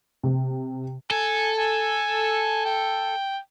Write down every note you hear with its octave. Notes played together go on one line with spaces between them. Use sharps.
C3
A4 G#5
G#5
G5